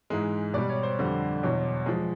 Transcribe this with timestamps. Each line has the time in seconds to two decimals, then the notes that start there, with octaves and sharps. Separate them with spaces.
0.10 G#2 E3 G#3
0.54 B2 G3 D5
0.69 C#5
0.83 C5
0.99 F2 D3 G3
1.43 E2 B2 F#3
1.86 F3 G#3